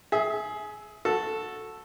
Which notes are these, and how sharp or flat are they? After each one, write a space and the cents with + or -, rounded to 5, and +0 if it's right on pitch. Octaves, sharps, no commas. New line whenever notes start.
G#4 +20 E5 -15
F#4 -15 A4 +0